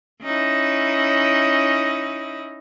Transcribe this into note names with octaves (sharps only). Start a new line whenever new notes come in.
C#4 D#4 E4